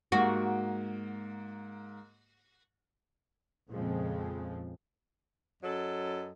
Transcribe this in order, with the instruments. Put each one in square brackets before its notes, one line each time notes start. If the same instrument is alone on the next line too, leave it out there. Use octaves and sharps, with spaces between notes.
[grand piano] G#2 A#3 [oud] F#4
[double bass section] F2 A#2 C#3 F3 G#3 C4
[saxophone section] F#2 F#3 A4 D#5